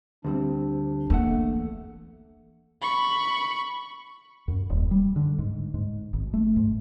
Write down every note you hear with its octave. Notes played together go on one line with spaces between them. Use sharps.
D2 G3 C4 D4
E2 A3 A#3 F#5
B5 C#6
F#2
D#1
G3
D3
G#2
G#2
G#1
A3
G#2